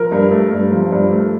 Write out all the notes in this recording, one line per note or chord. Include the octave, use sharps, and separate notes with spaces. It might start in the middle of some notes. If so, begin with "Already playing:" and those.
Already playing: F3 A#4
G2
A3
G2
F3
G2
A3